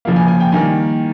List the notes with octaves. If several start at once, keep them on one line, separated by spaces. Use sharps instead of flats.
C#3 F3 A#3
G#5
G#5
G5
D#3 G3 A#3 G#5